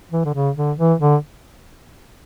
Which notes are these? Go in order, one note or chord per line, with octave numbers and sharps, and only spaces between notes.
E3
D3
C#3
D3
E3
D3